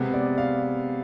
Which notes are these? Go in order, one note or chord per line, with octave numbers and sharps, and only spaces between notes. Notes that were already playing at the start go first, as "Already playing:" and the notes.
Already playing: C3 G#3 B3
D5
F5